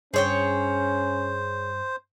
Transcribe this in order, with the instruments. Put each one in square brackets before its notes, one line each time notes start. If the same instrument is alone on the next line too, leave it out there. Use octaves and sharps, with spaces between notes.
[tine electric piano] G2 [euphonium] C#4 [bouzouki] G#4 C#5 G5 [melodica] C5